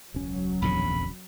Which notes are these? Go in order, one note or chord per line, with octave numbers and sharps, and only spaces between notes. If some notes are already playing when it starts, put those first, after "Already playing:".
E1 C#2 F#3 C#4
A#1 E2 D3 B5